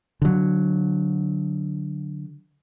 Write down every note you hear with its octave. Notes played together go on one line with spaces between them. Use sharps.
D3 F#3